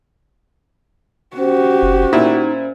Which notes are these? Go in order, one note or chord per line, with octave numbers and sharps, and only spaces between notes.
C#4 F#4 G4 C5
F#1
A#2 D#4 E4